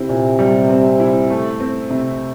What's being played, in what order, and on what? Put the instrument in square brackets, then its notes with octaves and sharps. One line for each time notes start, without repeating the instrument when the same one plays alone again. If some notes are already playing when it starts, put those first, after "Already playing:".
Already playing: [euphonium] C3 [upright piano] C4 E4
[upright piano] A#2
G3
C4
E4
A3
C4
C3